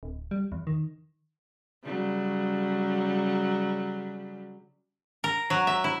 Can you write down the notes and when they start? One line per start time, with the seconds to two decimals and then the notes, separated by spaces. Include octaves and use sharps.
0.03 D1
0.31 G3
0.52 E2
0.67 D#3
1.84 C#3 F#3 G3
5.24 A#4
5.50 F#3
5.67 E5
5.84 E4